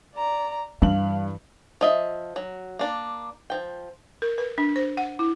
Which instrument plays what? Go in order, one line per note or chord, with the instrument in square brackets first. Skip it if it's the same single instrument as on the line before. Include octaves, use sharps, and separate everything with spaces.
[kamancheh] D5 A#5
[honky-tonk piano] G2 F#7 [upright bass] E3 [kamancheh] F5
[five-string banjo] F3 D#5 E5
F#3
A#3 D4
F3 G5
[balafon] A#4
B4
D4
C5
F#5
E4